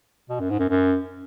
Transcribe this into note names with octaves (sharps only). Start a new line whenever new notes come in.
B2
F#2
G#2
F#2
F#2